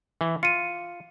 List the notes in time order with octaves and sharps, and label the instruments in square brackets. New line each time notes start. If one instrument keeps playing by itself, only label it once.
[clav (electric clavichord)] E3
[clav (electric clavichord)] F4 [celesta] C#7 D#7